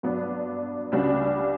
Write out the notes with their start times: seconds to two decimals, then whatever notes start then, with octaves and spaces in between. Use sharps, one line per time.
0.03 G2 F#3 B3 D4
0.92 C#2 C#3 G3 D4 F#4